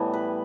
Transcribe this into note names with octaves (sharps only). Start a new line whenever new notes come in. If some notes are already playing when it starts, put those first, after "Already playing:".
Already playing: A2 E3 G3 B3
B4